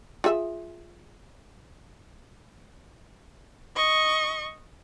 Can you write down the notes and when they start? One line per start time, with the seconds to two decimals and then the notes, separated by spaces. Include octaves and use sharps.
0.24 F4 G#4 E5
3.76 D#5 C#6